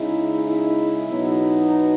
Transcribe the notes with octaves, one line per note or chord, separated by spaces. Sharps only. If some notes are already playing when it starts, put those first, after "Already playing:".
Already playing: C#3 G#3 D#4 E4
E4
B2 F#3 B3 D#4